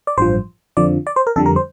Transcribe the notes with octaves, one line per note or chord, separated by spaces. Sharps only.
D5
A1 G2 F3 C5
F2 D3 F3 D5
D5
C5
A#4
F2 D3 G3 A4
A#4
C5